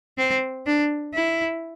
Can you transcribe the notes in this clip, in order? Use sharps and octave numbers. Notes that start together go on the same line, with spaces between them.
C4
D4
E4